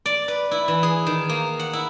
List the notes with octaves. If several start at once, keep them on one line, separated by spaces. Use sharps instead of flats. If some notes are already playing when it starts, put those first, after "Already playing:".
D5
B4
E4
E3
G#4
D#3
A#3
F#5
E4